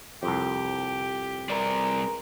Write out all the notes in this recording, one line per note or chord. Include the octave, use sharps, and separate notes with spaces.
C2 F2 G4
E2 G3 C4 G#4 A#4 D5